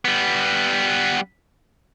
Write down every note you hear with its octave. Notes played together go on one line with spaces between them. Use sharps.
G3 B3